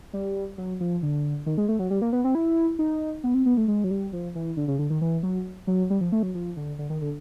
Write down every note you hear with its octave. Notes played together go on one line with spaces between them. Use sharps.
G3
F#3
F3
D3
D#3
G#3
A3
F#3
G3
A#3
B3
C4
E4
D#4
B3
C4
B3
A3
G#3
F#3
G3
F3
E3
D3
C#3
D3
D#3
E3
F#3
F#3
G3
F3
A3
F#3
F3
D3
D3
D#3
D3